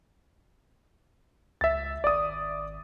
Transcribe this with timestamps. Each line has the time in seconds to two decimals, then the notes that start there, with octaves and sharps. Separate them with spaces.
1.61 C#2 E5 A6
2.04 G#1 D5 D#6